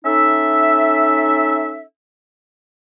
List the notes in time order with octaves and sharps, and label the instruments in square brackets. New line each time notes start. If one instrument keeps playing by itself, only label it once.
[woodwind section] C#4 D#4 A4 E5